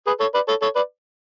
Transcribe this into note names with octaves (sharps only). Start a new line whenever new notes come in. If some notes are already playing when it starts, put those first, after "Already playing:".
G#4 B4
A4 C#5
B4 D5
A4 C#5
A4 C#5
B4 D5